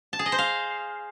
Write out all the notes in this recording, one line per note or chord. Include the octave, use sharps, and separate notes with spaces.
A5
G#4
D#5
C5
F5